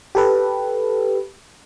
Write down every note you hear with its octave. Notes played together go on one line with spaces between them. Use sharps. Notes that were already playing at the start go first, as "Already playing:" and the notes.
G4 A4 B4